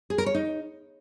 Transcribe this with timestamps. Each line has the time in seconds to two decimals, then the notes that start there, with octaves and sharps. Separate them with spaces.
0.10 G#4
0.18 A#4
0.26 C#5
0.35 D#4